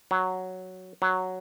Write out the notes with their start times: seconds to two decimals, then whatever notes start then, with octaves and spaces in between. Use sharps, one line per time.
0.11 F#3
1.02 F#3